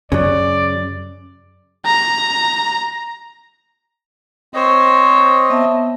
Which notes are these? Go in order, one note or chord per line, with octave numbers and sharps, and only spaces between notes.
F#2 C#3 F#3 D5
A#5
C4 C5 C#5 D#5
B3 E5 A5